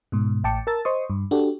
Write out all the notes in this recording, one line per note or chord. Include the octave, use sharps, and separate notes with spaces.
G#2 B2
A1 A2 G5 A5 D6 C#7
A#4 A5 E6 A6
C5 D#5 C6 C#6 D#6
G2
D4 F#4 G4 A4